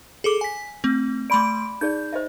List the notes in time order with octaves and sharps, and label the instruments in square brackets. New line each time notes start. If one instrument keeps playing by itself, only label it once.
[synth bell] G#4 A4 D6
G#5 B6
A3 C4
[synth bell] A3 C6 D7 [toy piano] D5 B5 D6
[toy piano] D#4 G#4 D5 [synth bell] G6
[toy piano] C5 D#5 E5